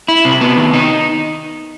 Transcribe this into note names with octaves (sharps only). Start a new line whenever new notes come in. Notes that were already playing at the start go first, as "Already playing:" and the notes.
E4
C3
B3
D#3
D#4